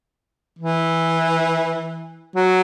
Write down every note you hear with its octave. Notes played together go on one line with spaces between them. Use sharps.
E3
F#3